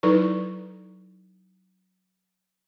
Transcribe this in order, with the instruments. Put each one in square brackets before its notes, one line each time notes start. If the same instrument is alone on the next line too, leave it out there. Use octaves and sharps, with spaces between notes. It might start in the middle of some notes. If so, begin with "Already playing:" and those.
[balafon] F#3 D#4 E4 A4 B4 C#6